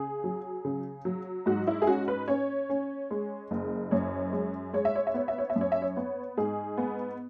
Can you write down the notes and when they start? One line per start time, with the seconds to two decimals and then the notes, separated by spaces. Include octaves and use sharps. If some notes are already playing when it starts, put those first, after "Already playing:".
Already playing: C#3 G#4
0.24 F#3
0.65 C#3
1.05 F#3
1.46 G#2 F#4
1.67 E4
1.82 G#4
1.87 C#4 F#4
2.08 B4
2.28 C#4 C#5
2.69 C#4
3.11 G#3
3.51 F#1
3.91 F#2 C#5
4.33 G#3
4.73 G#3 C#5
4.85 E5
4.95 C#5
5.07 E5
5.14 B3 C#5
5.28 E5
5.38 C#5
5.50 E5
5.56 F#2
5.61 C#5
5.72 E5
5.82 C#5
5.97 B3
6.37 G#2 G#4
6.77 B3